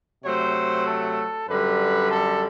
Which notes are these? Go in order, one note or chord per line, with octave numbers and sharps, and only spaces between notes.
C3 F#3 A3 C5
A4
F#2 D3 G3 B4
A4